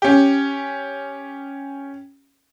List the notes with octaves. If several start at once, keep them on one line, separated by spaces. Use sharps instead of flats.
C#4 G4